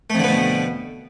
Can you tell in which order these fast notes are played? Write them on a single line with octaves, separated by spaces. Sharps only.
A3 F2 D3 B3 B2